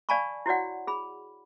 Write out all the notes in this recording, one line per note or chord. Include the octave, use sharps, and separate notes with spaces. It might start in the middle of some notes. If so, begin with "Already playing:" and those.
D5 F5 G#5 A5 B5 C#6
E4 F#4 C#5 D5 F#5
G#4 B5